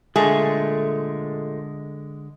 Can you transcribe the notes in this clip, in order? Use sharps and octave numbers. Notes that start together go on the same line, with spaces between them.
A#2 D3 G#3 A3 G#4